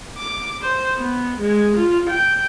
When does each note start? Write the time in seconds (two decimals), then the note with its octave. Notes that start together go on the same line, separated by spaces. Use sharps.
0.18 D6
0.62 C5
0.97 B3
1.40 G#3
1.77 F4
2.10 G5